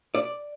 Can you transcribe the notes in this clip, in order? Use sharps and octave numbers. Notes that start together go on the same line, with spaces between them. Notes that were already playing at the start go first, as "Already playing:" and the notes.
D5